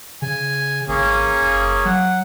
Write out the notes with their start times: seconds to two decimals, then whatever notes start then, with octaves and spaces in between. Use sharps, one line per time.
0.22 C#3 G#5
0.88 G#1 A#3 C#4 G#4
1.42 F#1
1.85 F#3 F#5